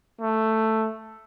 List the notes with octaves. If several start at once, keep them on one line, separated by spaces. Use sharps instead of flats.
A3